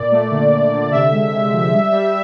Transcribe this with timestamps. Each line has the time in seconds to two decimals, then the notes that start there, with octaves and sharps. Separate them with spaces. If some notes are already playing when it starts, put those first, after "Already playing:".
Already playing: A#2 D5
0.12 A3
0.31 D3
0.51 A3
0.72 D3
0.91 C3 E5
1.11 G#3
1.32 G#3
1.52 F3
1.72 G3
1.92 G3